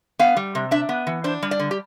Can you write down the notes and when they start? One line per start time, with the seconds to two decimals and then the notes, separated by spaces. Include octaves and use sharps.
0.19 B3 F5
0.37 G3
0.55 C3
0.71 D4 E5
0.89 B3
1.07 E3
1.24 D4 C5
1.43 G3
1.51 D5
1.59 D3
1.71 G4